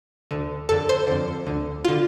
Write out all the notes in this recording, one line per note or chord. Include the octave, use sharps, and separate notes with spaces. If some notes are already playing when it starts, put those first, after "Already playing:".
D2 D3
F2 D3 A4
C5
F2 D3
D2 D3
D3 F4